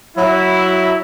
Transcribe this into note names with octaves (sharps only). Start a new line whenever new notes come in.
F#3 E4